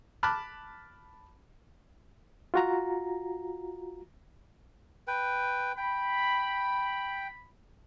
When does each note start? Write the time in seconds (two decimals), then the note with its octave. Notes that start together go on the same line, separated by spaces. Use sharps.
0.23 A5 B5 D6 F6 F#6
2.54 F4 F#4 A#5
5.07 B4 G5
5.77 G5 B5